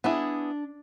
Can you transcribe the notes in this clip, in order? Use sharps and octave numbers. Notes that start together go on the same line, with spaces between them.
B3 D4 E4 G#4